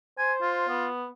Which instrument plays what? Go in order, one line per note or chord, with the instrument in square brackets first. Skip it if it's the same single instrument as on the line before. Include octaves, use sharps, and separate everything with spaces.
[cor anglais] C5 [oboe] G#5
[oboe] F4
[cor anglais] B3